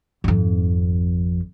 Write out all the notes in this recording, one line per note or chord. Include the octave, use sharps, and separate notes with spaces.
G#1 F2